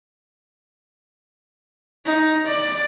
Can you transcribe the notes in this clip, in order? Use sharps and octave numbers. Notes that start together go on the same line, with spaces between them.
D#4
D5